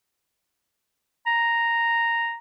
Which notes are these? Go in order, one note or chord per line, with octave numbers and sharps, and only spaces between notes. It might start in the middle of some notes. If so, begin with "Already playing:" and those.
A#5